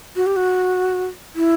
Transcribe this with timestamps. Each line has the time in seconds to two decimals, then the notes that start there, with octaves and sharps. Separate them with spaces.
0.16 F#4
0.26 G4
0.36 F#4
1.36 E4